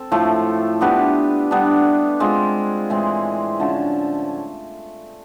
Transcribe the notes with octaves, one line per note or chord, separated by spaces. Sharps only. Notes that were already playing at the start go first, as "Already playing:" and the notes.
Already playing: C4 A4
A2 F3 A3
B3 D4 G4 B4
G3 B3 D4
G#3 C4 F4
A2 E3 G#3 C4
D3 F3 A3 C#4